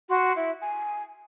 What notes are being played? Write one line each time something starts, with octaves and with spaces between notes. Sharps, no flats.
F#4 C6
E4
G#5